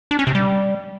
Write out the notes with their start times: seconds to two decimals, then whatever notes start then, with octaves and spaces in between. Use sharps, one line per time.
0.11 D4
0.19 C#4
0.27 C3
0.35 G3